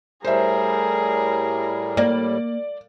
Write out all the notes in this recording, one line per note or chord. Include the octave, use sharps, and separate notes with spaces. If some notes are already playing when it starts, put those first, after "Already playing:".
A2 G3 G#4 A#4 C5 E5
A#3 D5